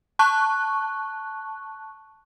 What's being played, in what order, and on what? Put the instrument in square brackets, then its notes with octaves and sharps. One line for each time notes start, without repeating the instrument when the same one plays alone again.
[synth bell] A5 C#6 F#6